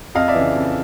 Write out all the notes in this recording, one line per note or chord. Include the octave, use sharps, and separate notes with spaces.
F2 D#5 F5
D5 E5
C#3 E3
F2